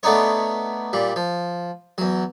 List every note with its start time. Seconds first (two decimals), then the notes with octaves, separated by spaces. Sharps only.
0.03 A3 B3 D4 D#4 C#5
0.93 A#2 G3
1.16 F3
1.98 E2 F#3